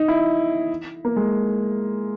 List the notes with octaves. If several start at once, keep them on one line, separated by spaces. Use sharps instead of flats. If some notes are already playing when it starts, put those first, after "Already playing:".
Already playing: D#4
E4
A#3
G#3